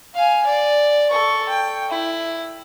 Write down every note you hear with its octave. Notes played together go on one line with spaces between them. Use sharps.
F5 G#5
D5
A4 C#6
G5
E4